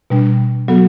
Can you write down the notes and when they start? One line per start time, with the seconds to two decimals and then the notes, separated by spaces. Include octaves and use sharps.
0.10 B2 G3 D4
0.68 F#3 B3 F#4 A4